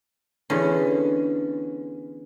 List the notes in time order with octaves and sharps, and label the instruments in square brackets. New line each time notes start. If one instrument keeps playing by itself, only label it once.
[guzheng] E2 D3 C#4